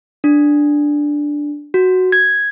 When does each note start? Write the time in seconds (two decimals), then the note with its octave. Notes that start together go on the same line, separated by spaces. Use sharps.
0.24 D4
1.74 F#4
2.12 G#6